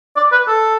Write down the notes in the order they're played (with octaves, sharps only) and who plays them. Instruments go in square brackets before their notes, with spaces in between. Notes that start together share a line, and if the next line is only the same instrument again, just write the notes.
[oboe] D5
B4
A4